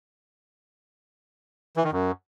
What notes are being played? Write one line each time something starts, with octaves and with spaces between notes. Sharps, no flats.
E3
D#3
F#2